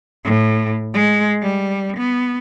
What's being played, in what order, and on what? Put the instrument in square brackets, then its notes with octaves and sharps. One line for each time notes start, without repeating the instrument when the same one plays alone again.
[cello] A2
G#3
G3
B3